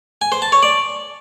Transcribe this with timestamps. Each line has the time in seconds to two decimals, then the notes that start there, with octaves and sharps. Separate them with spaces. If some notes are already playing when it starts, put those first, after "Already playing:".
0.22 G#5
0.32 C5
0.42 A5
0.52 C#5
0.63 D5